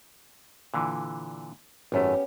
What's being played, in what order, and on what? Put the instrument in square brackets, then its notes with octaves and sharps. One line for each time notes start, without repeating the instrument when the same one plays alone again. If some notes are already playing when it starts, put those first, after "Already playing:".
[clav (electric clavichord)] A#2 D3 E3
[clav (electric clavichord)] G#1 F#2 A3 [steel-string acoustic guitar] B3 C#4 G4